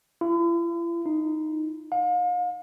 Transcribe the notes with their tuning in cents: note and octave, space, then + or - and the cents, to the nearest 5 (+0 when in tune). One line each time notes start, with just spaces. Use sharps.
E4 +45
D#4 -5
F5 +40